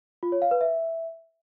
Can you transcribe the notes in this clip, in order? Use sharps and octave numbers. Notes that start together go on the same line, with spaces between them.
F4
C#5
F5
B4
E5